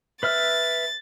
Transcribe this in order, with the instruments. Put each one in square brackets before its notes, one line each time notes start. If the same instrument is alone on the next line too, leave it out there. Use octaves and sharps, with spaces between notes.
[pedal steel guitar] B4 E5 F6 [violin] A6